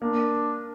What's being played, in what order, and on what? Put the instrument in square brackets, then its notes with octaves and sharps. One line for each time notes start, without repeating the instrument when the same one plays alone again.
[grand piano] A#3 [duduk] D4